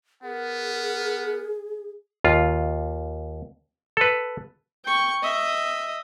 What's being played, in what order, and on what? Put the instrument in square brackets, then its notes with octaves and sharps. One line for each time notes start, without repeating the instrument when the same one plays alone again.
[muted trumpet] B3 [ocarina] G#4 [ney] A#4 [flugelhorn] F#5
[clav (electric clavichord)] D#2 F4
A4 B4
[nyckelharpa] G5 C#6
D#5 E5